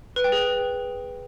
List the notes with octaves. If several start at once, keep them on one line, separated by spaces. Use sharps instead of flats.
B4
G5
G#4